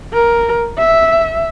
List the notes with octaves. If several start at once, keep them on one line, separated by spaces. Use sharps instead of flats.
A#4
E5